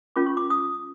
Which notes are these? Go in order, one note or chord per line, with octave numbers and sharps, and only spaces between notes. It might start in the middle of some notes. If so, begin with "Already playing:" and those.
C#4 F4 A#4 D6
C#6
D6
D#6